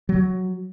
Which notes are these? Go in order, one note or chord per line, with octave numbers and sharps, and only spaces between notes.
F#3